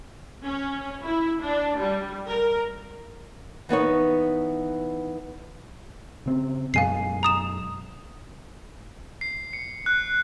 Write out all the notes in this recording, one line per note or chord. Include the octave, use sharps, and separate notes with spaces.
C#4
E4
D4
G3
A#4
E3 B3 D#4 C#5
C#3 C4
F#2 B2 G#3 F5 G#5 C7
A#5 D#6 E7
C7
C#7
F#6